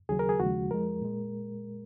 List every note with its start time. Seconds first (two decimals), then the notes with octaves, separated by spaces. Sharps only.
0.09 D#2 C#3 F#3 G#4
0.19 A#4
0.29 G#4
0.40 D#2 C#3 F3 G#3 F#4
0.70 F2 F3 G#3 A#4
1.01 A#2 G#3